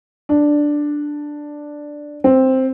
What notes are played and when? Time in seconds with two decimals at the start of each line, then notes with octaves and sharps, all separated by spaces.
0.29 D4
2.24 C4